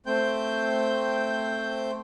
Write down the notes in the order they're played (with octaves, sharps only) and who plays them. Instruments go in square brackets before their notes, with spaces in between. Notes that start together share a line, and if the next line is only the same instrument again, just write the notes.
[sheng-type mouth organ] A3 C4 C5 G5 G6